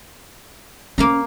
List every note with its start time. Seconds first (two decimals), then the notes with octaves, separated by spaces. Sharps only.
0.98 A#3 C#4 F5 A#5